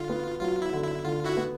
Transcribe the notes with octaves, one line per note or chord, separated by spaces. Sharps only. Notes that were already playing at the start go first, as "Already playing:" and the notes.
Already playing: D3 F4
B3
F#3 F4
E4
D3
E4
D3 F4
E4 F#4
B3